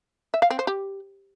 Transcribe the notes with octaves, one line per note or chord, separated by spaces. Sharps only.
E5
F5
C4
C5
G4